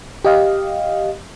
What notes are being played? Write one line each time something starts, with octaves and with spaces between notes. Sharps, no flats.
G4 D#5 F5